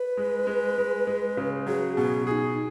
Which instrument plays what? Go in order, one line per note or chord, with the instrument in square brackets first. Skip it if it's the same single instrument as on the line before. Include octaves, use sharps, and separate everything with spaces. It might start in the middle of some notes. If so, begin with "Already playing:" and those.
Already playing: [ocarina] B4
[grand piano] G#3
G#3
G#3
G#3
C#3
[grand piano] F#3 [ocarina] G#4
[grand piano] B2 [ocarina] G#4
[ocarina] D#4 F#4 [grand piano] G#4